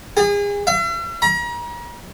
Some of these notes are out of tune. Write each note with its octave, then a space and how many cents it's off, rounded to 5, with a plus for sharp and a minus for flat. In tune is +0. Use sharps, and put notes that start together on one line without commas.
G#4 -35
E5 +45
A#5 +40